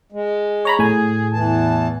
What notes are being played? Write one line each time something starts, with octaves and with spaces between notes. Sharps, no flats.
G#3
C#5 A#5 B5
A2 G#4 G#5
E2 E3 A5